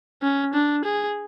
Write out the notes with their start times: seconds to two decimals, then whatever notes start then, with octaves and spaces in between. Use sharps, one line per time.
0.22 C#4
0.54 D4
0.84 G#4